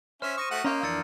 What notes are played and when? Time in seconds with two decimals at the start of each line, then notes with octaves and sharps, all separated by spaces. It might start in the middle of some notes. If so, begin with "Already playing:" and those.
0.22 C#4 C5 E5 F6 E7
0.37 C#6 D#6 A#6 D#7
0.51 A3 F#4 F#5
0.64 A#3 C#4 D#5 F5 A#5 C6 G6
0.83 F2 E3 D4 E6 A6 C#7